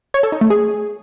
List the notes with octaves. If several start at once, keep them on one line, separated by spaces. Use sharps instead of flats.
C#5
A4
D#4
A3
G#4